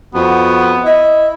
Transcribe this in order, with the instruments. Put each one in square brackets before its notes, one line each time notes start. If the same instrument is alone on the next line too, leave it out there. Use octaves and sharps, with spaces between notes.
[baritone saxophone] F2 [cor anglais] B3 [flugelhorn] F#4
[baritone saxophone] E4 [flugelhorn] D#5